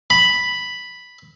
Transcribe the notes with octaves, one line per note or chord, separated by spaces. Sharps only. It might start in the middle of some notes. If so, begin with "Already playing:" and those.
B5